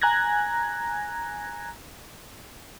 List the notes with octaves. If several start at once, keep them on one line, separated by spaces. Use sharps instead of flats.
G#5 A#5 F#6 G#6 A#6